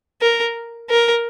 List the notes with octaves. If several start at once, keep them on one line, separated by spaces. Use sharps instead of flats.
A#4
A#4